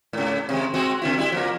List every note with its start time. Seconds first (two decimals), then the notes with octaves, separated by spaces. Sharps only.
0.13 G#2 C#3
0.49 C3 D#3 G#3
0.74 G#3 C4 F#4
1.02 C#3 C4 E4
1.17 G3 E4
1.32 F3 A#3 A#4